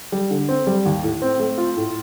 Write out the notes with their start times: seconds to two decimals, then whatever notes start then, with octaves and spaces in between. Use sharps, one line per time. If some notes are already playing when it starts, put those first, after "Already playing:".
0.12 G3
0.30 D3
0.49 C4
0.67 G3
0.85 D#2
1.03 A2
1.22 C4
1.39 A3
1.58 F4
1.76 A2